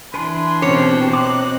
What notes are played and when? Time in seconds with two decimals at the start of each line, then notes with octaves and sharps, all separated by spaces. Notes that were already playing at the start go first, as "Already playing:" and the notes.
0.14 E3 D4 B4 G#5 C6
0.62 B2 C4 C#4 G4 C#5
1.13 C4 D#5 A#5 D6 F#6